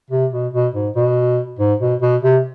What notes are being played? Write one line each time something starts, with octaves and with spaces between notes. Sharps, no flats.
C3
B2
B2
G#2
B2
G#2
B2
B2
C3